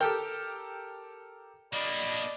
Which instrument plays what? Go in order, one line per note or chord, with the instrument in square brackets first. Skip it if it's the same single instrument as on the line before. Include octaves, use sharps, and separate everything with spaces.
[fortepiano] G4 A4 A#4 [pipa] G5
[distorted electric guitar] A#3 D4 [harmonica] D5 D#5 B5